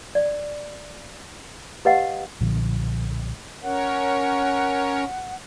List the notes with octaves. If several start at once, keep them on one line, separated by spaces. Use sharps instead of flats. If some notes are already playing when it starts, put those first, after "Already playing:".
D5
G4 B4 D#5 F5 F#5
B1 A#2 D3 F3
C#4 A#4 C#5 F#5